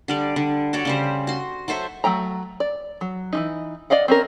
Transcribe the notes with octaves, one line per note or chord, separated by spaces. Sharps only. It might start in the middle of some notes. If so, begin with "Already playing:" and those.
D3 G3 D5
D3
F#4 A4 C#5 D5
C#3 G3 C5
F#4 C6
F#3 A4 C5 E5
F#3 A3 G5 A#5
D5
F#3
E3 F3 D#4
D5 D#5 F5 F#5
C4 C#4 A#4